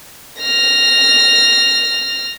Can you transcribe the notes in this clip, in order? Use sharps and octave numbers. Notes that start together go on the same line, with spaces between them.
F6 A#6